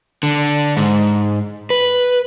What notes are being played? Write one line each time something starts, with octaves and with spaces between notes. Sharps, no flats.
D3
G#2
B4